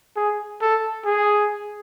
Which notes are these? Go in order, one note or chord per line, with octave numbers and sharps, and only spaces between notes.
G#4
A4
G#4